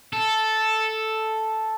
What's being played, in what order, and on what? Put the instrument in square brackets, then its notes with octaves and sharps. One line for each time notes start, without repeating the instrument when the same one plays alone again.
[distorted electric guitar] A4